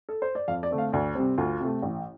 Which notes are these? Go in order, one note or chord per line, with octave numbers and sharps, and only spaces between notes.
A4
C5
D5
F2 F5
D5
D3 A3 C4
F5
D2 D5
C3 G3 C4
D2 F4
C3 A3
A1